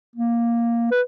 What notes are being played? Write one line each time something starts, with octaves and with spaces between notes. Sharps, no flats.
A#3
B4